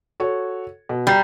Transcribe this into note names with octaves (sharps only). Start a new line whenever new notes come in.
F#4 A4 C#5
B2
G3 A#5 A6 C7